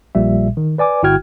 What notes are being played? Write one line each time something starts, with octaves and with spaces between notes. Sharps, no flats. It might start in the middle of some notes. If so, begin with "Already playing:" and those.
A#1 A#2 G3 E5
D#3
B4 D5 G#5 D6
G1 E4 F#4 G5 F6 G#6